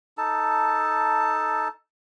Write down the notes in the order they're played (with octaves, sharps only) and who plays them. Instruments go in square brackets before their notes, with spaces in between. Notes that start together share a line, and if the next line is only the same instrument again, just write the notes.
[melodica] D#4 A4 A5